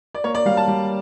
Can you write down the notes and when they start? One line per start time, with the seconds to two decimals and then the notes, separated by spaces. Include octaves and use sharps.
0.14 D5
0.24 A#3 C#5
0.35 D5
0.45 G3 F5
0.57 A5
0.68 G3